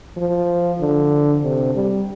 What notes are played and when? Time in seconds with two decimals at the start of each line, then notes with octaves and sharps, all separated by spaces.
0.17 F3
0.80 D3
1.43 C3
1.74 G3